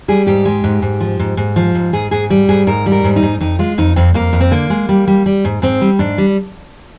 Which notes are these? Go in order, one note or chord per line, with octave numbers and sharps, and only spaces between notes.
G3 G#4
G#2 G4
G#3
G#2
G#2
F3
G#2
G#2
F3
G#2
G#2 G#4
G#2 G#4
G3
G#2 G#4
G#2 A#4
G3
A#4
G#2
D#4
G#2
F2 D#4
G#3 F4
F2 D#4
F2 C4
F2 A#3
F2
C4
D3 A#3
G#3
G3
G3
G3
G#2
G#2 C4
G3
G#2 D4
G3